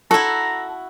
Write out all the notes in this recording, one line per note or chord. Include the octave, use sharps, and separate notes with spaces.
E4 F#4 A4 A#5